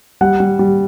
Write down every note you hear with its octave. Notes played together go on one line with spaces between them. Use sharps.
G3 F#5
G3
G3